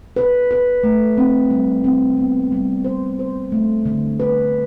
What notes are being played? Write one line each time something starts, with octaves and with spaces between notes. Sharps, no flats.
B4
B4
A3
C4
G3
C4
B3
G3
C5
C5
A3
D3
B4